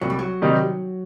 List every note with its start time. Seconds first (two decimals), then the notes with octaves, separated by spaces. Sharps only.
0.01 C2 F#3
0.10 G3
0.19 F#3
0.42 C3 D#3 G3 D#4